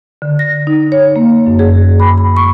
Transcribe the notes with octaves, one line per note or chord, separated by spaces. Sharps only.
D3
A#6
D#4
C#5
A#3
F#2
G#4
B5
B5
C#6